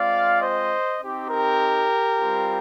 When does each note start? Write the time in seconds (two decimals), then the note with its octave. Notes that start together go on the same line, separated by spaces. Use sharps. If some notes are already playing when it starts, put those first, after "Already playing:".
Already playing: G#3 C4 F4 D5 F5
0.41 C5 D#5
1.00 C4 D#4 G4
1.29 G4 A#4
2.17 G3 C4 F4